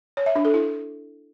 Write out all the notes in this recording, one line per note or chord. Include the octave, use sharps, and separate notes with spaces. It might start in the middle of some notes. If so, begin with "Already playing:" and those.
C#5
E5
D4
A4
E4